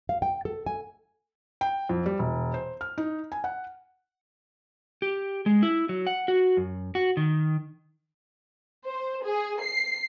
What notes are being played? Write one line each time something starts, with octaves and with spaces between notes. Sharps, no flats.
F5
G5
A4
G#5
G5
F2
G3
E1
C5
F6
D#4
G#5
F#5
G4
G#3
E4
F#3
F#5
F#4
F#2
F#4
D#3
C5
G#4
C7